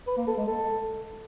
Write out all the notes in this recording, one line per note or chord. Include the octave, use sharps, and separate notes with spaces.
B4
A#3
A4
G#3
A4